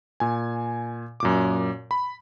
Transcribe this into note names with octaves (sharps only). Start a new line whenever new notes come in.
A#2 G#5
F#2 A#2 D6
B5